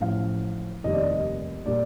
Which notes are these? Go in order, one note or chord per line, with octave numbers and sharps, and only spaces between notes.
A1 A2 F3 F5
F1 D#2 D#3 G3 D#5
D5
D#5
A#2 G3 D5